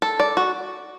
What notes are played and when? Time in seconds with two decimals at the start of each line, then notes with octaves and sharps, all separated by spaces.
0.02 A4
0.20 D5
0.37 F#4